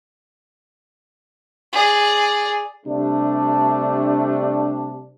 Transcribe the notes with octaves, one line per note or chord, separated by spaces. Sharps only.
G#4 D5
C3 G3 A3 D4